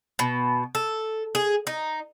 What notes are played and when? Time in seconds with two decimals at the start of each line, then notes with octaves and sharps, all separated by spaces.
0.19 B2
0.75 A4
1.35 G#4
1.67 D#4